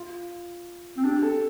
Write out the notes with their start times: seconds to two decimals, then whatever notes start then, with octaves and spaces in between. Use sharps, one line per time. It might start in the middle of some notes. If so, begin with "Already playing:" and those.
Already playing: F4
0.97 C4
1.04 D4 G4
1.23 A4